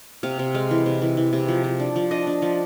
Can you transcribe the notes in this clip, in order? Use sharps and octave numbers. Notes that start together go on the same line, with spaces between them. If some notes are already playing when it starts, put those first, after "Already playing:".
C3 F5
C3
G#3 F5
E3
C3
E3
E3
C3
F3
F3
D4
F3
D4 D#5
D4
F3